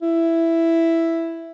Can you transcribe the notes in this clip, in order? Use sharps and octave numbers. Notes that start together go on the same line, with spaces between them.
E4